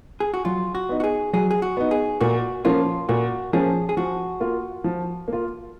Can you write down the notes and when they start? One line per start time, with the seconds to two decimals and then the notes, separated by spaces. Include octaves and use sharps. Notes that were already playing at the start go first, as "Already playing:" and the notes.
0.20 G#4
0.34 F#4
0.45 F#3 F4
0.75 F#4
0.89 B3 D#4
1.00 F#4
1.04 G#4
1.33 F#3 G#4
1.51 G#4
1.62 F#4
1.77 B3 D#4
1.91 G#4
2.21 A#2 F#4
2.65 F3 A#3 C#4 F4
3.09 A#2 F#4
3.53 F3 A#3 C#4 G#4
3.89 G#4
3.97 F3 F#4
4.40 A#3 F4
4.84 F3
5.28 A#3 F4